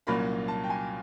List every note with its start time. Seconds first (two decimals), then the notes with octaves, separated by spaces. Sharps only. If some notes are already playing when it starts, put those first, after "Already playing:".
0.07 C2 A#2 F#3 A#3 C#4 B5
0.48 A5
0.63 G5
0.70 G#5